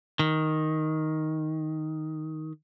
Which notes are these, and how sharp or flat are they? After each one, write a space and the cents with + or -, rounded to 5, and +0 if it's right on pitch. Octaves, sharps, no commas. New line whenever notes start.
D#3 +5